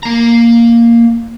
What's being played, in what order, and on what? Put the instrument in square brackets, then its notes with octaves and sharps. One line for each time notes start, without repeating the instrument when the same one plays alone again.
[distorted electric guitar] A#3 A#5